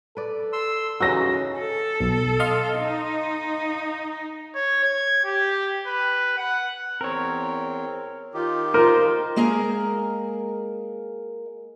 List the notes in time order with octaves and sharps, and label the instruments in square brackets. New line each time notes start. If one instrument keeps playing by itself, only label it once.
[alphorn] A4 [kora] B4 D5
[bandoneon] C6 E6
[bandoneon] C#3 E3 [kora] C#4 D#4 F#4 [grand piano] E6 A#6
[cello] A4
[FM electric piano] B1
D#5 F5 C6
[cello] D#4
[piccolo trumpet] C#5
G#6
G4
B4
F#5
[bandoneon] E2 C4 [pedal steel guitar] A#4 C#5
[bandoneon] D#3 D#4 G4 [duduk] F4
[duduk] F4 [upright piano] A#4 [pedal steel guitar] C5
[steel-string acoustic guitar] G#3 A#3 G#4 A#4 A#5